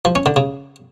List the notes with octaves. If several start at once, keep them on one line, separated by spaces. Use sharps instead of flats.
F3
C#4
D3
C#3